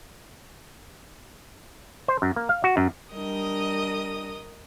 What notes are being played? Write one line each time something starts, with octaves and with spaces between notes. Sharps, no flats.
C5
F#2
A#3
F5
F#4
F#2
G3 D4 A#4 D#5 D#6